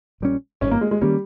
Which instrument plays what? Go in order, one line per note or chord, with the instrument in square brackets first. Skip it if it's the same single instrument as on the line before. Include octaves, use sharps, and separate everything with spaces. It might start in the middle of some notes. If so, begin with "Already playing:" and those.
[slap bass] A#1 A#2 G3 C#4
[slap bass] G#1 G2 D#3 [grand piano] C#4
[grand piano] A#3
G#3
G#3
[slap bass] D#3 A#3 C#4 [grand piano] G3